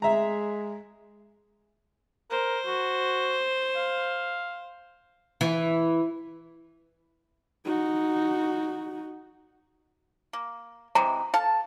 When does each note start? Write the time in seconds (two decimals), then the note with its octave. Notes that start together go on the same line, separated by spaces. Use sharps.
0.02 G#3 E5 A#5
2.30 A#4 C5
2.66 F#4
3.76 F5
5.41 E3
7.65 D#4 F#4
10.33 A#3
10.95 C3 E3 G#3 A#5
11.34 A4 F5 A5